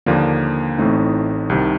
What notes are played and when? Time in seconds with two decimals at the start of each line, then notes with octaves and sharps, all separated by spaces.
0.06 D#2 D3 F3 A#3 D4
0.78 A1 A2 A3 C4 D#4
1.50 C2 C3 D#3